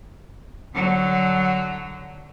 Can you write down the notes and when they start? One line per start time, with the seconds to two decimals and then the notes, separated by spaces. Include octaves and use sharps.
0.75 D3 F#3